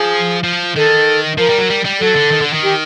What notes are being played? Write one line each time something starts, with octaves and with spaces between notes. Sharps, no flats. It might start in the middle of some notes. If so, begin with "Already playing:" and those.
Already playing: F3 G#4
F3
D#3 A4
F3 A#4
G3
F#3
G3
G3
F#3 A4
D3
D#3
D3
D#3
G4